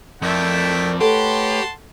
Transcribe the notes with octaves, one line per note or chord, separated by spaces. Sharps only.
F2 A3 E4 A#4 D5 G5
A3 G4 A4 B4 C#5 F#5 A5 C6